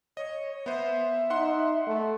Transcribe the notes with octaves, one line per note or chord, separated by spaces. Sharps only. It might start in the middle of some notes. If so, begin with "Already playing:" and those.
C#5 D#5
B3 C5 E5
D#4 F#5 C6
A3